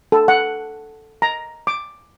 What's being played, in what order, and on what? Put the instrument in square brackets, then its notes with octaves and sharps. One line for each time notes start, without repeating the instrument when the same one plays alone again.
[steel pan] A4
F#5
A#5
D6